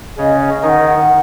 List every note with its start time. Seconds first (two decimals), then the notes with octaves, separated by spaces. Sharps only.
0.17 C#3 C#4 D#5
0.40 D#5
0.63 D#3 D#4 F#5
0.85 F#5